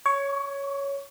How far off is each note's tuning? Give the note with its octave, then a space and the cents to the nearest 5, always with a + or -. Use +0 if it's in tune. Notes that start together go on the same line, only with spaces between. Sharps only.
C#5 +5 C#6 +45